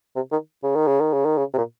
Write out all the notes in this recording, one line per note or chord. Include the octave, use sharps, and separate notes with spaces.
C3
D#3
C#3
D#3
C#3
D#3
C#3
D#3
C#3
C3
A#2